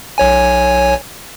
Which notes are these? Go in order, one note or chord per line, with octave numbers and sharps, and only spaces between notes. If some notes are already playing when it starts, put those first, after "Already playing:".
B1 C#5 G#5